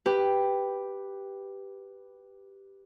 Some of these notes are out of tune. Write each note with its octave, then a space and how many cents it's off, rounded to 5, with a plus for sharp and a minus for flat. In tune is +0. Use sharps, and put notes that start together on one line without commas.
G4 +0 B4 +0